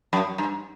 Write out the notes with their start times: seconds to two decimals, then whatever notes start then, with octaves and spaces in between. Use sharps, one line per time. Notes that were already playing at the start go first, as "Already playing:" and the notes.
0.13 F#2
0.38 G2